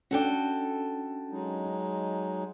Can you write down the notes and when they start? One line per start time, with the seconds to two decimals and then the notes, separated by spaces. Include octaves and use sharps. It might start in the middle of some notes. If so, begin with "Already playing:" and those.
0.11 C#4 D4 F#4 A4 G5
1.31 F#3 G#3 D#4